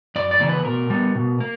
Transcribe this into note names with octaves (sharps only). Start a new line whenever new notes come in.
F#2 D5
D5
C#3 E3 A#3
B4
B2 A#4
G3 B3
B2
A#3